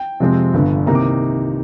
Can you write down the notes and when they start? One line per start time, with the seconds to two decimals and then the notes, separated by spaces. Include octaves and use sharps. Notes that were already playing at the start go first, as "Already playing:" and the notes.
Already playing: G5
0.20 F2 C3 F3 G#3 C4
0.53 G1 G2 D3
0.86 C2 C3 D#3 A#3 D#4 A#5
0.95 D6